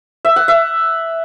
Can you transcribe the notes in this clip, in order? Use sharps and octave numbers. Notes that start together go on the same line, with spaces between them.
E5
F#5
E5